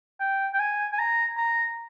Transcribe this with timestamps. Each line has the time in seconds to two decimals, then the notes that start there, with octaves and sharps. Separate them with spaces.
0.20 G5
0.53 G5
0.59 G#5
0.92 G#5
0.98 A#5
1.37 A#5